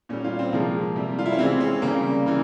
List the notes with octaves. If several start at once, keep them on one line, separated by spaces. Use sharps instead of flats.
A#2 G3 C#4
F4
C4
C3 F3 G#3 A#3
C3 G3
F4
E4
C#4
C3 E3 G#3 C4
C#4
C#3 G3 A#3
C#3 E3